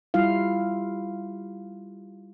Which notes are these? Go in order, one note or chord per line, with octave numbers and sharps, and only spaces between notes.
G3 E4 F4 F5